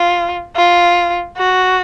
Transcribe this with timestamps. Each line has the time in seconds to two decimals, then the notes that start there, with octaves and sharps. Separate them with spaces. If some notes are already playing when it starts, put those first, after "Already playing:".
Already playing: F4
0.56 F4
1.38 F#4